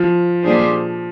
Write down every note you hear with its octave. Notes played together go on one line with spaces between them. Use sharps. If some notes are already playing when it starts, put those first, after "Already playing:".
Already playing: F3
A#2 G3 D4 G#4 C5